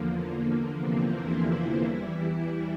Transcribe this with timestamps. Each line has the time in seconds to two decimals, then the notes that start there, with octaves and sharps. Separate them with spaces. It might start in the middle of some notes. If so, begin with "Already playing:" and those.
Already playing: E2 D3 F3 A#3
0.44 A#3
0.78 C3 C4
1.13 E3 E4
1.81 E2 E3 G3